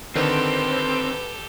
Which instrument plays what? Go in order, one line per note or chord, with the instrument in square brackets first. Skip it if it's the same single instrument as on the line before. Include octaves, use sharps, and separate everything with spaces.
[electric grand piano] D3 D#3 [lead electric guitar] C4 [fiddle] G4 A4 [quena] B4